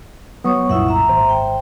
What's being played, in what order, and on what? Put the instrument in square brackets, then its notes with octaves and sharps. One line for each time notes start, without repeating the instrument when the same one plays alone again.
[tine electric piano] F#3 B3 [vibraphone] C#5 C#6 D#6
[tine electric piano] C2 F#2 A#2 [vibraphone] E4 E5 F#5
[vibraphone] E5 A#5
[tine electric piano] G#1 C5
[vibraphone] G5